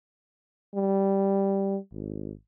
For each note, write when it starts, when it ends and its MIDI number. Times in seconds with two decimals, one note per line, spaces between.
0.75 1.78 55
1.92 2.32 32